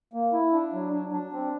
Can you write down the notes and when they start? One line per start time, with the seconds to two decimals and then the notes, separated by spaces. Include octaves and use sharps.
0.14 A#3
0.33 E4
0.53 D4
0.73 F#3
0.93 D4
1.13 D4
1.33 C4